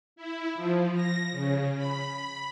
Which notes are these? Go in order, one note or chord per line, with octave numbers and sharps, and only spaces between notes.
E4
F3
A#6
C#3
B5